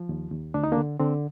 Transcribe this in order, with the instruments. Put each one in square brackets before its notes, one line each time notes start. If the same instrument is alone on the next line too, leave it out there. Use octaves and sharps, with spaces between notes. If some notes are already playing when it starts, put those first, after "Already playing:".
Already playing: [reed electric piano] F3
D#2
D#2
D2 D4
D#4
A#3 D4
D3
D3 C4